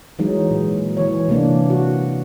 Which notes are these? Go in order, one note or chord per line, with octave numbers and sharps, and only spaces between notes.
E3 F#3 G#3 D#4
A#2
E3 C#5
C3 E3 A#3 D4
F#4